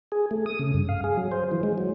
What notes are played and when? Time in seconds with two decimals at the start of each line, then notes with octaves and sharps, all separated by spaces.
0.12 G#4
0.31 A3
0.46 D#6
0.59 C#3
0.74 G2
0.89 F5
1.04 G#4
1.17 F#3
1.32 C5
1.52 E3
1.63 G#3
1.78 F#3